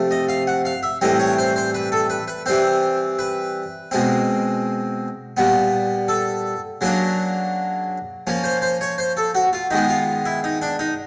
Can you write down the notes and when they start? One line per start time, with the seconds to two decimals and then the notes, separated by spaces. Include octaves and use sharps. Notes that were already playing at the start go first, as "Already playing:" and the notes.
Already playing: C3 F3 A3
0.11 D#5
0.28 F5
0.47 F#5
0.65 F5
0.83 E5
1.01 A2 E3 G3 C4 D#5
1.20 C#5
1.38 C5
1.56 C5
1.74 B4
1.92 A4
2.10 B4
2.28 B4
2.46 E3 G3 C4 C5
3.19 B4
3.91 B2 G#3 C4
5.37 A#2 G3 B3
6.08 A4
6.81 C#3 F#3 A#3 D4 A#4
8.27 F3 A#3 C#4
8.44 C5
8.62 C5
8.81 C#5
8.98 C5
9.17 A4
9.35 F#4
9.53 F4
9.71 D#3 G#3 B3 D#4
9.89 F4
10.26 E4
10.44 D#4
10.62 D4
10.79 D#4